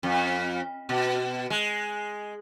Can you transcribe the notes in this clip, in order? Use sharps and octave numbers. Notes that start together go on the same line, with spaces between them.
F2
B2
G#3